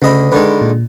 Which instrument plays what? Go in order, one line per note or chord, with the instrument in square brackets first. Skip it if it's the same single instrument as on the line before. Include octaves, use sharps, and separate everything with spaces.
[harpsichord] D2 D#5 B5 [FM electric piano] C#3
[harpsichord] D3 D#3 G#3 [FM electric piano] B4
[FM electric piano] A#2